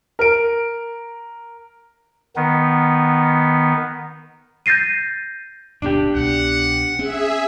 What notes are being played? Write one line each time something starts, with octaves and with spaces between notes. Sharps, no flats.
A#4 D7
D#3 B3
G6 A6 A#6 C7 D#7
D1 G2 B2 D4 G4
C2 B2 B3 F#5
C4 C#4 G#4 E5